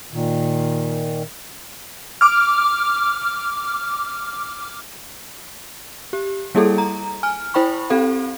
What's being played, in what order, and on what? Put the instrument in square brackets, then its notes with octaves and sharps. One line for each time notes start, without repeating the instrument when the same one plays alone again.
[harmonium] A#2 D#3
[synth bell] D6 F6
G4
G3 A#3 E4 G#4 A4
A#5
G#5 F6
E4 C5 G5 B5 C#6
C4 G4 A4 F5